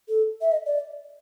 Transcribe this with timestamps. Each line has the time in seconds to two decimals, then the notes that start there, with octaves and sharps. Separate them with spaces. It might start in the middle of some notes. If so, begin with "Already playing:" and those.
0.09 A4
0.41 E5
0.52 D#5
0.66 D5